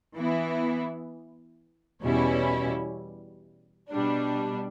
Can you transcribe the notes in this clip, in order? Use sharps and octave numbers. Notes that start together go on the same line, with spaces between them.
E3 B3 E4
E2 B2 G3 C#4 E4
B2 G3 D4